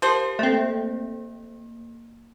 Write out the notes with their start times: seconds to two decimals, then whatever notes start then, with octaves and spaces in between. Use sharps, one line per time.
0.02 F3 G4 A#4 C5
0.39 A3 A#3 C4